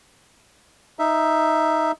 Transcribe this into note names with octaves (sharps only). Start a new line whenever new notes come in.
D#4 E5